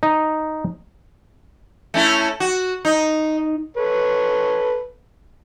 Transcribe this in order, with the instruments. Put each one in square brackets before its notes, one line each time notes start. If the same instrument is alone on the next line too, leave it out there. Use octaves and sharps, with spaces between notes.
[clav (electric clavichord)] D#4
[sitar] A3 C#4 E4
F#4
D#4
[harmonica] A4 B4 C#5